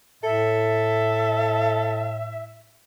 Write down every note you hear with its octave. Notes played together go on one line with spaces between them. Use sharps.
A2 A4 E5